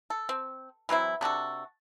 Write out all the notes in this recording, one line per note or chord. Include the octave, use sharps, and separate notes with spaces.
A4
C4
E3 F#3 C4 E4
C3 D4 F#4 A4